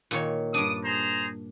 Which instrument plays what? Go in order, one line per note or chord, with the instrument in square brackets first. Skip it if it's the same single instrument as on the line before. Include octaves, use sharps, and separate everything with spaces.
[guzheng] A#2 D#3 C#5
[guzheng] G2 D4 [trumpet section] D6 D#6
[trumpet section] G#4 C5 A#5